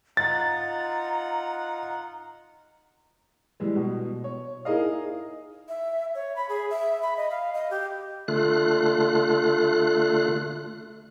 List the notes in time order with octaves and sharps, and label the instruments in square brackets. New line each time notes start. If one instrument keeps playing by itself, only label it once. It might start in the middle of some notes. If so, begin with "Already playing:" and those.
[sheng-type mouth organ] D#4 F4 F#5 [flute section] A#5 [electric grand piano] A6
[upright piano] E3 G3 G#3
B2
C#5
D#4 E4 G#4 A#4 D#5 F5
[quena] E5
C#5
B5
G#4
E5
B5
D#5
F5
D#5
G4
[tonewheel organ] D3 A3 F4 F#6